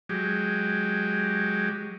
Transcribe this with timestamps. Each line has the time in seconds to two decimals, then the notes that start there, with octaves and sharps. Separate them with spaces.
0.09 F#3 G#3 G4